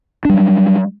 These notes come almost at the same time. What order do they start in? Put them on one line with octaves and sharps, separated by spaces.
D4 G3 F#3